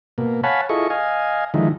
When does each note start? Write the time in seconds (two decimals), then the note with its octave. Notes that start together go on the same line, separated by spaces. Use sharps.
0.18 B2 A#3
0.44 C#5 F5 F#5 G#5 A5 B5
0.69 E4 F4 G#4 A4 D#5 C#6
0.90 D#5 F5 G#5
1.54 D3 D#3 F3 G#3 D#4 E4